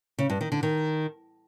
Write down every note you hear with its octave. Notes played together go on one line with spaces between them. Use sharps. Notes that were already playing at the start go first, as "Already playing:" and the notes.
C#3
G2
D#3
D3
D#3